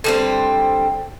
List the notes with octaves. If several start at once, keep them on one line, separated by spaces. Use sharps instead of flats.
D3 G3 C4